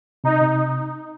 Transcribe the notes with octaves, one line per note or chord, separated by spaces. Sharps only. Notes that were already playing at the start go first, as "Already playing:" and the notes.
C3 D#4
C3